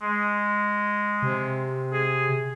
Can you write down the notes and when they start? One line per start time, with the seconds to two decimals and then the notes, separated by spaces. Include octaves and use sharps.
0.02 G#3
1.23 C3
1.93 G#4